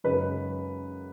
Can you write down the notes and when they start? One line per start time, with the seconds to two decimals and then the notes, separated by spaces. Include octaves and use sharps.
0.04 F#2 C#3 G#3 D#4 B4